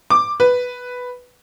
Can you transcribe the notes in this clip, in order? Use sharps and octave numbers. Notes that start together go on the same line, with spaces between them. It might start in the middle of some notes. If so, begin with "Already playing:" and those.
D6
B4